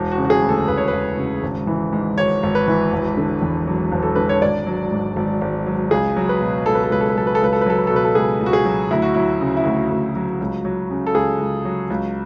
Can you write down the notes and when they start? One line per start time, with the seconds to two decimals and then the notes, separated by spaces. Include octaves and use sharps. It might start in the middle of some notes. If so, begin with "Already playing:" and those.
Already playing: E1
0.11 F#4
0.18 C#3
0.25 F#4
0.30 G#4
0.43 D2
0.49 A4
0.68 E1 B4
0.77 C#5
0.88 E1 B4
1.17 C#3
1.43 G#1
1.67 E3
1.93 G#2
2.17 G#1 C#5
2.43 G#1
2.55 B4
2.67 E3
2.92 E1
3.17 D3
3.42 E2
3.67 F#3
3.92 E1
4.02 A4
4.16 D3 B4
4.29 C#5
4.42 G#1 D5
4.66 F#3
4.92 G#2
5.16 G#1
5.41 G#1
5.66 F#3
5.91 C#2 G#4
6.17 F#3
6.29 B4
6.41 B2
6.66 C#2 A4
6.75 B4
6.83 A4
6.91 C#2 B4
7.01 A4
7.09 B4
7.16 F#3 A4
7.27 B4
7.35 A4
7.42 C#2 B4
7.53 A4
7.61 B4
7.66 F#3 A4
7.78 B4
7.87 B2 A4
7.96 B4
8.05 A4
8.15 C#2 G#4
8.41 C#2
8.46 F#4
8.53 G#4
8.65 F#3
8.91 D2 E4
9.02 F#4
9.14 F#3 E4
9.41 C#3
9.57 E4
9.65 D2 F#4
9.90 D2
10.16 F#3
10.41 C#2
10.65 F#3
10.91 C#3
11.06 A4
11.15 C#2 G#4
11.40 C#2
11.65 F#3
11.90 C#2